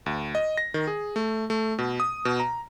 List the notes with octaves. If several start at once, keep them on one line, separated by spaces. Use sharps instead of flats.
D2
D#5
A#6
D#3
G#4
A3
A3
B2
D#6
B2
A#5